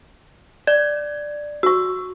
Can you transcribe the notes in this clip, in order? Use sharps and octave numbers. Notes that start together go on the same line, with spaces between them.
D5 G#6
F#4 C#6 E6